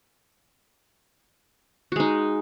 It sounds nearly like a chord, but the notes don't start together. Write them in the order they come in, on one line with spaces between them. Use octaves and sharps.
F#4 G#3 D#4